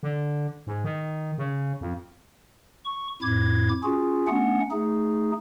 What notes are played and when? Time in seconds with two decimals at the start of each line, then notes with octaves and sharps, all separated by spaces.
0.03 D3
0.67 G#2
0.84 D#3
1.38 C#3
1.81 F2
2.85 C#6
3.22 F2 A2 E4 D6 G#6
3.83 C#4 F4 F#4 G#4
4.28 A3 B3 C#4 D4 F#5
4.71 A3 D#4 G#4